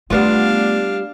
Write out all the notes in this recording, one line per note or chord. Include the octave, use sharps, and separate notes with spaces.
D#3 G3 A3 B3 D4 F4 F5